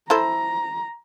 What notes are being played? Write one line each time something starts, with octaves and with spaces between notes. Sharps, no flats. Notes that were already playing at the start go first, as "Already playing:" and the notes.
E4 A4 C5 A#5